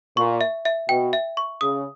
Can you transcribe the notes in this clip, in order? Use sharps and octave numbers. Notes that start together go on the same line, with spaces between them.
A#2 C#6
E5
E5
B2 G5
E5
C#6
C#3 D#6